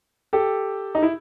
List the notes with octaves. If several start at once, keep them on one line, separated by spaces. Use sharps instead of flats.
G4 A4
D#4
E4